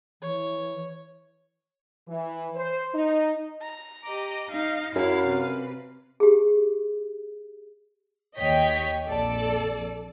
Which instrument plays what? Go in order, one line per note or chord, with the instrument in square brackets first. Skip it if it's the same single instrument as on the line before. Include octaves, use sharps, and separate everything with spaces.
[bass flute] E3 [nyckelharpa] C#5
[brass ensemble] E3
C5
D#4
[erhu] A#5
[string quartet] G4 D#5 D6
[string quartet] D#4 [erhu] F5
[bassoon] F#2 [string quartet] E4 [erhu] F5
[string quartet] C3 B4
[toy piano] G4 G#4
[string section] D#2 C#5 D#5 G5 B6
A#1 F2 A4 D5